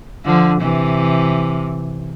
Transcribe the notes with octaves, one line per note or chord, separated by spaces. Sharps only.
D3 F3
C3 E3